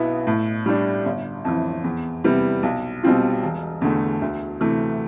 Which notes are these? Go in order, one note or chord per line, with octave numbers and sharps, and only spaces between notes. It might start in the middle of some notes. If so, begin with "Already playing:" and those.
Already playing: B1 B2 B3 E4
A2
G3 D4
G1
F2 E3
E2
C3 G3 B3 E4
B1
B2 G3 C4 F4
E1
E2 D3 A3
D2
C3 E3 A3